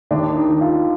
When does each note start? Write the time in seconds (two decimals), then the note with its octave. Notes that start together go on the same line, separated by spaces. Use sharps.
0.11 D#2 D4
0.36 D#4
0.48 D#3
0.61 F4